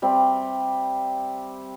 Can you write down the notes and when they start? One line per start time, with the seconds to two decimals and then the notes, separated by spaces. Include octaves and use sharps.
0.02 G3 C4 E5